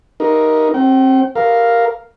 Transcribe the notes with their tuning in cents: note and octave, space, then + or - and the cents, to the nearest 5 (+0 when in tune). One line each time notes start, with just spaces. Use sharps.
D#4 +0 A#4 +15
C4 +30 G5 -35
A#4 +0 F5 +0